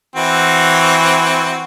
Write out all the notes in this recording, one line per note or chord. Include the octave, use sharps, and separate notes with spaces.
E3 C4 F#4